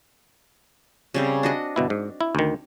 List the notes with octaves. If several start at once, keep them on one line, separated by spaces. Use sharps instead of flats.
C#3 G3 C4
D4 F#4 D#5
G1 B2 E4
G#2
E4
D2 D#3